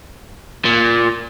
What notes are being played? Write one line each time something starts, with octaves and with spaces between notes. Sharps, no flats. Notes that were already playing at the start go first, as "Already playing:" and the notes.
A#2